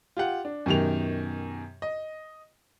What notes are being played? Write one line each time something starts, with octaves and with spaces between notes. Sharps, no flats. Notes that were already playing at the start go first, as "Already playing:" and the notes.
F4 G4 F#5
D4
F#2 B2 D#3 G4 F7
D#5